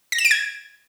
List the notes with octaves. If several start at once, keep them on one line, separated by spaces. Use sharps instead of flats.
A#6
E7
D7
G#6